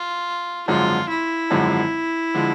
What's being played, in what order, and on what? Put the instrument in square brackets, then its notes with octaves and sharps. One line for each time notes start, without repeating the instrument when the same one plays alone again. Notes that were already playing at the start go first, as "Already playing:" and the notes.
Already playing: [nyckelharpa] F4
[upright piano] G#1 F#2 D3 F3 G#3 [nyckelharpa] F4
[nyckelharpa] E4
[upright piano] G#1 F#2 D3 F3 G#3
D3 F3 G#3